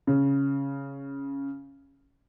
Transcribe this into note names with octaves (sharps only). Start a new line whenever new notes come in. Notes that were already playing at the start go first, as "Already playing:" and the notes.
C#3